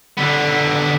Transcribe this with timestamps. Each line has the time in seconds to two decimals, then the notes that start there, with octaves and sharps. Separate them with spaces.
0.18 D3 B3